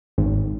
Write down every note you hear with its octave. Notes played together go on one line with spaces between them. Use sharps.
G#1